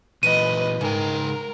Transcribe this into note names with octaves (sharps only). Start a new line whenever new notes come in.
A#2 E3 B4 D#5 D#7
G#2 C#3 A#4 G5